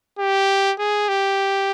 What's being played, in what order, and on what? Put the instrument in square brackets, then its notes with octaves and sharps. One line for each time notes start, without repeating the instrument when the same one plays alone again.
[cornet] G4
G#4
G4